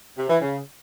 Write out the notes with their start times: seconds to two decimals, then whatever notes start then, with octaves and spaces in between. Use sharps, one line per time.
0.18 C3
0.30 E3
0.41 C#3